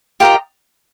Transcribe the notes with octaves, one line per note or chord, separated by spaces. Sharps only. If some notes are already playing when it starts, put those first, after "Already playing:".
F4 G4 A#4 D#5 G5